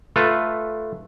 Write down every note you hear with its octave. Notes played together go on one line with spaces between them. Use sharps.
A3 F4 A4 B4